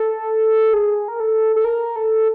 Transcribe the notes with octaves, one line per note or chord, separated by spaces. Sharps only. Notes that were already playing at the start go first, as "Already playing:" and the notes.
Already playing: A4
G#4
A#4
A4
A4
A#4
A4